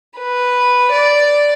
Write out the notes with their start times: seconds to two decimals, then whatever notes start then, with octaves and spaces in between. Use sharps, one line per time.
0.18 B4
0.92 D5